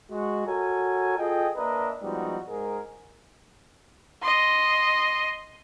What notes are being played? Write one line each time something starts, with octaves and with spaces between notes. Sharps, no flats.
G#3 F#4
F#4 A4 A#4 C#5 G#5
F4 G#4 A4 D#5 G5
A#3 D4 A#4 B4 D#5 E5
F3 G3 G#3 B3 D#4 F#4
G#2 D#4 G#4 A#4
D#5 C6